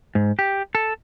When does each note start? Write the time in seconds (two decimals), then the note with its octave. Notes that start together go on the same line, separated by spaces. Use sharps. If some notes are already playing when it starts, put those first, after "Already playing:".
0.15 G#2
0.39 G4
0.75 A4